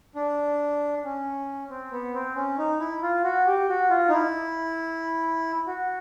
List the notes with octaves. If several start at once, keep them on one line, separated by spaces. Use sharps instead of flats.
D4
C#4
C4
B3
C4
C#4
D#4
E4
F4
F#4
G4
F#4
F4
D#4
E4
F#4